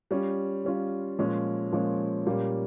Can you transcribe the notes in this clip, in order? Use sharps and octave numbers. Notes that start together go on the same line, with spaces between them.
G3 C#4 F4
G3 C#4 F4
A#2 F3 G#3 C#4
A#2 F3 G#3 C#4
A#2 G3 A#3 C#4